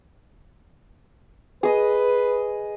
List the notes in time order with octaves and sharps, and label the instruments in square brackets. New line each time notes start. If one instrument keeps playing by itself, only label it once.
[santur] G#4 D#5 [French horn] B4